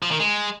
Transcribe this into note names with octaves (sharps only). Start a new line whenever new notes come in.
F3
D#3
G#3